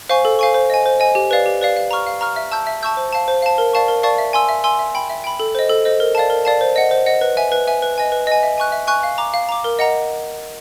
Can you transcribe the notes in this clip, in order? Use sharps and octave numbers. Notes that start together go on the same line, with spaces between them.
C5 F5 G#5 C#6
A4
C5 F5 G#5 C#6
C5
D#5 G#5
C5
D#5 G#5
G4
B4 D5 F5
G4
B4 D5 F5
F5
A#5 C#6 F6
F5
A#5 C#6 F6
E5
A5 C#6 E6 G6
E5
A5 C#6 E6 G6
C5
F5 A5
C5
F5 A5
A#4
D5 F5 A5 C#6
A#4
D5 F5 A5 C#6
E5
G#5 C6 E6
E5
G#5 C6 E6
E5
G5 B5
E5
G5 B5
A4
C5 D#5
A4
C5 D#5
A#4
D5 F5 A5
A#4
D5 F5 A5
C5
D#5 F#5
C5
D#5 F#5
B4
E5 G#5
B4
E5 G#5
B4
D#5 G#5
B4
D#5 G#5
E5
G#5 C#6 F#6
E5
G#5 C#6 F#6
F5
A#5 D6
F5
A#5 D6
A#4
D#5 F#5 A#5